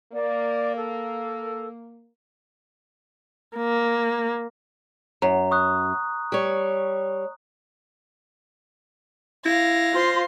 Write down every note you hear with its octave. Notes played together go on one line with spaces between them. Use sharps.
A#3 D5
A4
A#3
F#2 A#5
C#6 D#6 F#6
G3 C#5
E4 F5 A#6
F4 C5 C6